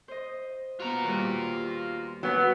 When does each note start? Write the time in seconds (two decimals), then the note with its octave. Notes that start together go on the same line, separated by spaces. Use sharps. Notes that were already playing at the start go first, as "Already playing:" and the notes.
0.08 C5 D#5
0.80 B3 F4 F#4 A#5
1.04 D#2 G3
2.23 F#3 B3